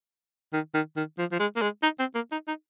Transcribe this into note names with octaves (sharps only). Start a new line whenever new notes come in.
D#3
D#3
D#3
F3
F3
G#3
A#3
G#3
D#4
C4
A#3
D#4
D#4